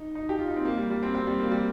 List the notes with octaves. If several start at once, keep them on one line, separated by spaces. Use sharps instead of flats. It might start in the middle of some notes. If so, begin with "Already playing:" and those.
Already playing: D#4
D#4
G4
F4
D#4
C4
A#3
G3
G3
C4
C4
G3
A#3
G3